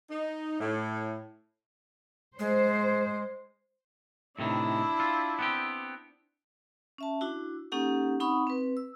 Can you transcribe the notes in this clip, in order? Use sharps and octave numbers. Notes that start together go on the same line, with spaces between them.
D#4
A2
G#3 C5
A2 C3 D#3 D4 E4
F4
B3 C4 G4
C#4 E5 A5
D4 E4 F#4
A#3 C#4 D#4 G4 A4 F#5
C4 D#4 F#5 B5 C#6 D#6
C4 B4
E6